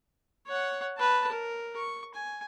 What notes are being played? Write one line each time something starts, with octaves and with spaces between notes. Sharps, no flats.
C#5 F#5
B4 A5
A#4
C#6
G#5